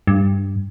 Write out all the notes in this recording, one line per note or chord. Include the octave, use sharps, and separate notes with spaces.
G2